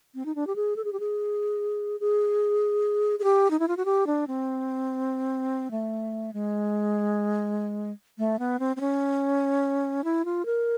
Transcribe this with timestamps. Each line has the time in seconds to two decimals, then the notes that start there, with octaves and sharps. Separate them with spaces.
0.15 C4
0.26 D#4
0.35 D4
0.47 G4
0.56 G#4
0.76 A4
0.84 G#4
0.93 G4
1.00 G#4
2.00 G#4
3.19 G#4
3.24 G4
3.51 D#4
3.60 E4
3.68 F4
3.77 F#4
3.85 G4
4.07 D4
4.28 C4
5.71 A3
6.33 G#3
8.18 A3
8.39 B3
8.59 C4
8.76 C4
8.81 C#4
10.04 E4
10.25 F4
10.46 A#4